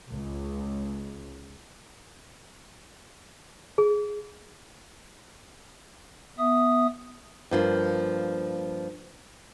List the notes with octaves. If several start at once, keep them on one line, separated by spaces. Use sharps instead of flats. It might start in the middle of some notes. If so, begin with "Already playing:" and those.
C#2
G#4
B3 E5 D#6
G2 F3 A#3